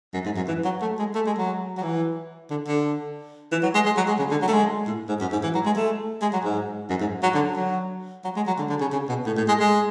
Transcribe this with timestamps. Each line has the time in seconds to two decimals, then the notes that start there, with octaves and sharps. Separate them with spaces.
0.14 F#2
0.25 G#2
0.37 F#2
0.48 E3
0.65 F#3
0.81 A3
0.99 G#3
1.15 A3
1.27 G#3
1.38 F#3
1.77 F#3
1.83 E3
2.50 D3
2.67 D3
3.52 E3
3.63 F#3
3.74 G#3
3.86 G#3
3.97 F#3
4.08 G#3
4.19 C#3
4.31 D3
4.42 F#3
4.48 A3
4.53 G#3
4.87 A2
5.09 G#2
5.21 F#2
5.32 G#2
5.43 E3
5.55 F#3
5.66 G#3
5.77 A3
6.22 G#3
6.33 F#3
6.44 G#2
6.90 F#2
7.01 G#2
7.23 F#3
7.35 D3
7.57 F#3
8.24 F#3
8.36 G#3
8.47 F#3
8.59 D3
8.69 D3
8.81 C#3
8.92 C#3
9.09 B2
9.26 A2
9.37 A2
9.48 G#3
9.60 G#3